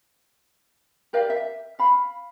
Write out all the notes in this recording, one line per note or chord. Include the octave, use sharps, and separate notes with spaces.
G4 A#4 D5 F5
E5
F5 B5